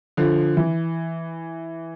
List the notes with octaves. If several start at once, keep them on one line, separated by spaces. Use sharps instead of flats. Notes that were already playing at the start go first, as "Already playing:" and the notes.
D3 F3
E3